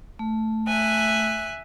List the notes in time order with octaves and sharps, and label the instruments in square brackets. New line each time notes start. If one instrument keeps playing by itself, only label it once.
[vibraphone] A3
[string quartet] E5 G#5 F#6